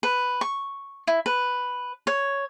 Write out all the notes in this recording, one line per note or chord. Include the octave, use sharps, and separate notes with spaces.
B4
C#6
E4
B4
C#5